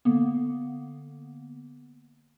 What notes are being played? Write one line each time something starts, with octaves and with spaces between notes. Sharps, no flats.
D3 A#3 B3